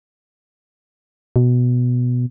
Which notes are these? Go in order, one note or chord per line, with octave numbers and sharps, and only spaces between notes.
B2